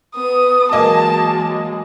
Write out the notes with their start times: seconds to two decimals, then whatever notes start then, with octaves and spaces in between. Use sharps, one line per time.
0.15 B3 D#6
0.72 E3 F#3 G#3 A#3 D#5 A5 D6